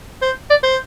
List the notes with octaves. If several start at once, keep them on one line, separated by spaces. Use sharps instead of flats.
C5
D5
C5